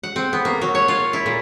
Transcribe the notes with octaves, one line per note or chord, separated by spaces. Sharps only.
F#5
C4
B3
A#3
F#3
C#5
F4
E4
A#2